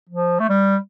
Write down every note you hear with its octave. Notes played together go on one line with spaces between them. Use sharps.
F3
A3
G3